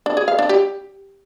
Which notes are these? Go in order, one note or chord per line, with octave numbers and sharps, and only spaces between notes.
D4
G#4
F5
D4
G4